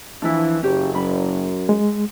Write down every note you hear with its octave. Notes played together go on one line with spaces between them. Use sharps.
E3 F3 D4 E4
F#1 C#4 G4
F#2 B5
G#3